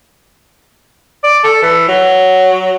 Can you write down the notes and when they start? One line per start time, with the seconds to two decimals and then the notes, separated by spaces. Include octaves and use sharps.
1.23 D5
1.44 A4
1.62 E3
1.88 F#3